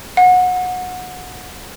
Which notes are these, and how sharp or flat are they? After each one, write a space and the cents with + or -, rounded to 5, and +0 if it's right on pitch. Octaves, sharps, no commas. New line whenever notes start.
F#5 -20